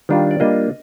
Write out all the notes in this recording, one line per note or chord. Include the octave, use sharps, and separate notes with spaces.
D#3 G3 D4 F4
D5
G3 A#3 D4 F4 D#5